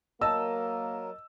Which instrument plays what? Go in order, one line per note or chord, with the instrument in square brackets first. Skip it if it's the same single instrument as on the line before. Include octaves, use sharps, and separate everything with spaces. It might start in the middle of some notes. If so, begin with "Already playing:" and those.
[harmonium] F#3 A#4 [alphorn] A#3 [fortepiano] D#5 A5 [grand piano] E6